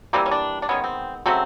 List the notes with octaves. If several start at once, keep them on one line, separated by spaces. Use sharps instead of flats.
E3 G3 A#3 C4
C#4
D4
D4
D#3 G#3 B3 C#4
C4
C#3 F#3 A3 C4